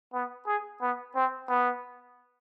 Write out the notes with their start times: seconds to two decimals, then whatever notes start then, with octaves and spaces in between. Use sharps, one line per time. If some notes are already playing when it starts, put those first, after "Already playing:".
0.13 B3
0.47 G#4
0.81 B3
1.15 C4
1.49 B3